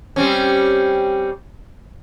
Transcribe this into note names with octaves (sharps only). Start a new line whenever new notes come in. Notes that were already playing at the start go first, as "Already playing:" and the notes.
G3 C4 C#4